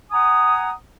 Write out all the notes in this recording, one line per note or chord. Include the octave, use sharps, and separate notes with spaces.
F#5 G#5 A#5 D#6